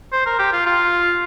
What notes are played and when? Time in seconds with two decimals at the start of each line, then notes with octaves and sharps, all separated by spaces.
0.13 C5
0.26 A#4
0.39 G4
0.53 F4
0.66 F4